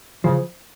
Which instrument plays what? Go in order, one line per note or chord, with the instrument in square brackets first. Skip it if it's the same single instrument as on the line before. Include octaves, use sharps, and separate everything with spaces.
[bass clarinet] C#3 [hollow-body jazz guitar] F3